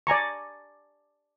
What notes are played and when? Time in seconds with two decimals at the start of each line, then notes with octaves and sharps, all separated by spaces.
0.07 D5 G#5 A#5 C#6